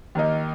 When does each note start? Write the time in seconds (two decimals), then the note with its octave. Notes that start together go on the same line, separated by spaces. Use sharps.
0.15 D#2 D#3 A#3 D#4